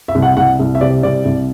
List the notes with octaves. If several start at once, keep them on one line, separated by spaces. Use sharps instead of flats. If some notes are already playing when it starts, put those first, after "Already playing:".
E5
C2
F#5
C2 F#5
C2
E5
C3 D5
C2 D5
C2